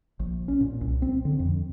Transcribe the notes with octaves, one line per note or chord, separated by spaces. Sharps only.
A#1
C#4
A#2
C2
C4
D3
F2